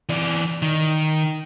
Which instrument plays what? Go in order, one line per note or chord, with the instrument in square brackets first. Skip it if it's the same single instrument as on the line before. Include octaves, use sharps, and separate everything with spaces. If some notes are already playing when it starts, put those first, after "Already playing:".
[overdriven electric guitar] E3 D5
D#3